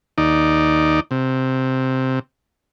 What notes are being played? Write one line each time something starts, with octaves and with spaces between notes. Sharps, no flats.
D#2 D#4 D5
C3